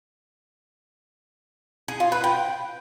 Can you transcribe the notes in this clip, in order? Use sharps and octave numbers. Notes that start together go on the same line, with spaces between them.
G#4
F4
B4
G5